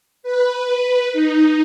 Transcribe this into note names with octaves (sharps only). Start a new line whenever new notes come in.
B4
D#4